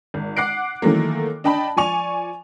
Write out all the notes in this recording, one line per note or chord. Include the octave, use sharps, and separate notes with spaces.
G#1
F#5 D6 F#6 C7 D7
D#3 E3 F#3 A3 A#3
D4 D#5 G5 A5 B5
F3 D5 G#5 C#6 F7